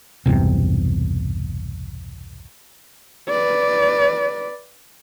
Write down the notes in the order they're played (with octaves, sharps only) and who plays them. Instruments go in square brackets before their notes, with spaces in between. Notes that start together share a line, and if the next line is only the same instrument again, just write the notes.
[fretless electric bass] B1 E2 G2 C3
[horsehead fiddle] B4 D5